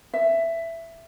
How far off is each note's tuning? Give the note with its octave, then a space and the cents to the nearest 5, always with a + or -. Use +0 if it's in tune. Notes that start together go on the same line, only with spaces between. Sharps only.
E5 +10